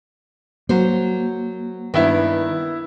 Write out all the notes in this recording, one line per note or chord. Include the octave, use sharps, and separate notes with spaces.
F#3 A#3 C5
G2 D#3 B3 E4